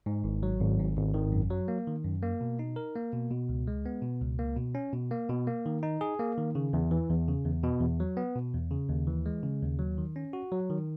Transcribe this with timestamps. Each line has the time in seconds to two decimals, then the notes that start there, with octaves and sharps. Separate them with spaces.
0.06 G#2
0.24 G#1
0.43 F#3
0.60 G#1
0.79 G#2
0.97 G#1
1.14 D#3
1.32 F#2
1.50 F#3
1.68 A#3
1.87 D#3
2.05 F#2
2.23 A#3
2.41 B2
2.59 D#4
2.76 A#4
2.95 A#3
3.13 B2
3.31 B2
3.49 C#2
3.67 G#3
3.86 B3
4.02 B2
4.21 C#2
4.39 A#3
4.56 B2
4.75 C#4
4.93 B2
5.11 A#3
5.29 B2
5.47 A#3
5.66 D#3
5.83 D#4
6.01 G#4
6.19 A#3
6.37 D#3
6.55 C#3
6.73 E2
6.91 E3
7.09 E2
7.28 C#3
7.45 E2
7.64 B2
7.81 E2
8.00 F#3
8.17 B3
8.36 B2
8.54 E2
8.71 C#3
8.89 D#2
9.07 E3
9.26 G#3
9.43 C#3
9.62 D#2
9.79 F#3
9.98 D#3
10.16 C#4
10.33 F#4
10.52 F#3
10.70 D#3